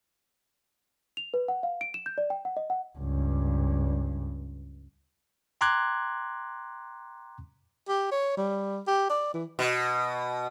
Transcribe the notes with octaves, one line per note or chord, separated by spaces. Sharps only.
F7
B4
F#5
F5
D7
E7
G6
D5
G5
F#5
D#5
F#5
C#2 G2
G5 A#5 C6 D6 F#6 G#6
G4
C#5
G3
G4
D5
E3
B2